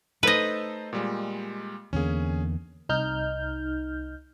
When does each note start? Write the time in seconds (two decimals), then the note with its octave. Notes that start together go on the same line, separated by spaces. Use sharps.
0.23 A3 D#4 A4 B4 C5 D#5
0.93 A#2 G3 G#3
1.93 E2 D3 A#3 C#4 G#4
2.89 C2 D#4 F6 G6